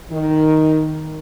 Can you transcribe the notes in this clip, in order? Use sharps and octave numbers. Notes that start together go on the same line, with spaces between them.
D#3